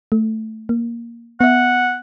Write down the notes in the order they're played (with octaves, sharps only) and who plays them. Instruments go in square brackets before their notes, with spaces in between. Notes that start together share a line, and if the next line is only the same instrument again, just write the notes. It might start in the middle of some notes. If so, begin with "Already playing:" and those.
[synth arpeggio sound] A3
A#3
[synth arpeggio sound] B3 E5 [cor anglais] F#5